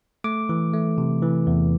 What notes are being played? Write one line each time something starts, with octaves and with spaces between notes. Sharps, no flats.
A3 D6
E3
A3
C3
E3
E2